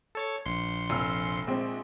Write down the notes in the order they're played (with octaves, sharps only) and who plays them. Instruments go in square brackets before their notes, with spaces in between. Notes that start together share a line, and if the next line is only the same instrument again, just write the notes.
[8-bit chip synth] A4 C#5 A6
A#1 C6 C#7
[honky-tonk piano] F1 E6 F6
A#1 G#3 C4